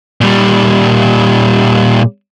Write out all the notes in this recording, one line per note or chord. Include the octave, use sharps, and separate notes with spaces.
A#2 G3